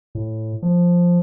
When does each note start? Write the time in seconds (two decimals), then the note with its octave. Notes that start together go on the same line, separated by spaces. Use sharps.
0.15 A2
0.62 F3